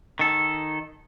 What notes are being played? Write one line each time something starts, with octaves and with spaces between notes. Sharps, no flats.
D#3 A4